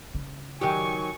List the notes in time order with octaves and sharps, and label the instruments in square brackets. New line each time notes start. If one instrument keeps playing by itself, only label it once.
[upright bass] C#3
[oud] D#3 F#3 G4 [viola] G#5 C#6